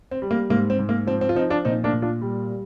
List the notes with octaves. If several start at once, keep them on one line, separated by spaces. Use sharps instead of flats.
C4
G3
A#3
G#2 A#3
C4
G#2
A#3
F3 C4
C4
F4
F3 C4 D#4
D4 F4
A#2 C4 D#4
A#3 D4
A#2
D4 F4
G3
G3